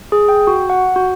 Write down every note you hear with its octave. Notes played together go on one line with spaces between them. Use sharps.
G#4
G5
F#4
F#5
F#4